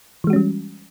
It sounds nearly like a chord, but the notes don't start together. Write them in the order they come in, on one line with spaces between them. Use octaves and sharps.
E3 G#3 F#4 C#4 G3